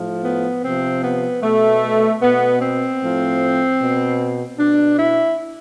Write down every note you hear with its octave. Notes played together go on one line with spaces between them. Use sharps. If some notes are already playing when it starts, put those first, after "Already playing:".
Already playing: A2 F3
B3
C3 F3 C4
B3
B2 A3
B2 B3
C4
A2 F3
B2
B2 D4
E4